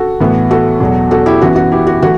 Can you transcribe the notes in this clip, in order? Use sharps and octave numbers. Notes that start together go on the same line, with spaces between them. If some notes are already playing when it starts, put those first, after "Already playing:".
Already playing: F#4 A4
A2 E3 B3
F#4 A4
E2 B2 F#3
F#4 A4
E4 G4
F#2 E3 B3 F#4
F#4
E4 G4
F#4
E3 A3 F#4